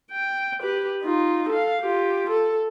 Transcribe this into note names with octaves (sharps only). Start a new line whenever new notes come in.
G5
G4 B4
D#4 F4
A4 F5
F4 G4
A4